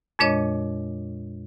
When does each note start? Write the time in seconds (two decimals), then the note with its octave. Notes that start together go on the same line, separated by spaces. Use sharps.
0.19 F2 A#2 G#3 D4 C#5 D#5